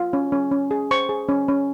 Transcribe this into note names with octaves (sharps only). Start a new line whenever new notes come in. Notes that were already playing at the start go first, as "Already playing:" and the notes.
Already playing: F4
C#4
C#4
C#4
G#4
C5 C#6
G#4
C#4
C#4